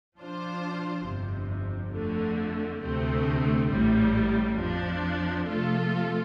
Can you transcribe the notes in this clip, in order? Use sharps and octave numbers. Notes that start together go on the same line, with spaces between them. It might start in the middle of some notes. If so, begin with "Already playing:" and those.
F3 D4 F4 C5
G1 F2 C3
F2 D3 A3
D2 C3 A3 C4
A1 A2 G3
F2 F3 D4
C3 F3 A3 F4 A4